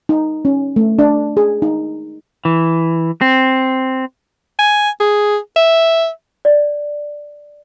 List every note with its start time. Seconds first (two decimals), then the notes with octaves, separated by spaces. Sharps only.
0.09 D#4
0.45 C#4
0.76 A3
0.99 D4
1.37 G#4
1.62 D#4
2.45 E3
3.21 C4
4.59 G#5
5.00 G#4
5.56 E5
6.45 D5